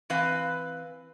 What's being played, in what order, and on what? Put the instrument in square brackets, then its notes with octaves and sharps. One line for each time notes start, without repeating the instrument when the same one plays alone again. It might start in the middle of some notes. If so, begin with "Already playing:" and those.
[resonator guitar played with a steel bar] E3 C4 B4 F5